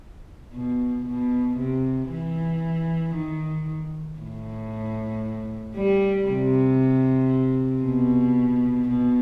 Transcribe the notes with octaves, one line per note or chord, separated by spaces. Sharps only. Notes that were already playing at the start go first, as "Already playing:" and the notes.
B2
B2
C3
E3
D#3
A2
G3
C3
B2
B2